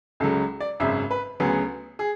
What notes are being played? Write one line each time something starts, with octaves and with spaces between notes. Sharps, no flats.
C#2 C#3 F#3 A4
D5
G#1 F#2 C#3 E5
B4
D2 C#3 F#3 B3 G#4
G#4